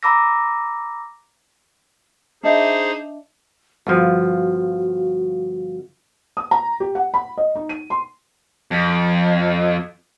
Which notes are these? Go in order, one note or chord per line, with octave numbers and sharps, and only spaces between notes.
A#5 B5 D6 E6 A#6
D4 D#4 G#4 C5 D#5 E5
G1 F3 F#4
D#6
A#5
G4
F#5
B5
D#5
D#4
D#7
C6
F2